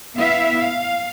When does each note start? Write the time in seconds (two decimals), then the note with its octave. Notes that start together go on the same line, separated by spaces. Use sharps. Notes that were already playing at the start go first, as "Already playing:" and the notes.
0.17 B3 E4 E5 F5
0.58 F5